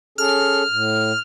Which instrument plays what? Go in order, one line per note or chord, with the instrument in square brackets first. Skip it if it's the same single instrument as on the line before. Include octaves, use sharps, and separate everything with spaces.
[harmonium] C#4 G#4 A4 [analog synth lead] F6
[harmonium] A2